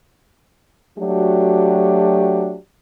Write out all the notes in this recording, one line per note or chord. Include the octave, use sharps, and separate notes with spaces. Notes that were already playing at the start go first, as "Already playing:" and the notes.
F#3 A3 D4 F#4 G4